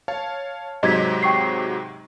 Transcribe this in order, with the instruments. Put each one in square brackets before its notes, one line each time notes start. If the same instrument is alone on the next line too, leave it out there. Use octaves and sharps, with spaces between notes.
[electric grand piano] C#5 F5 A5
[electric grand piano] G#2 C3 F#3 [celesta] D#5 G#6 B6
[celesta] G5 C#6 C7